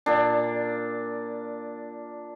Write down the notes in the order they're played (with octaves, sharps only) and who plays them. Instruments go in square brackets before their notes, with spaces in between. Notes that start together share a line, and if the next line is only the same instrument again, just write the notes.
[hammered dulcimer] A#2 D4